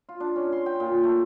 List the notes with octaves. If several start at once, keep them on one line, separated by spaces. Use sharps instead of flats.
F4
D4
C#4
C6
G5
A#2
A3